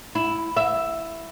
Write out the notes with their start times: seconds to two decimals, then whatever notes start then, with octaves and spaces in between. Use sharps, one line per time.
0.15 E4
0.57 E5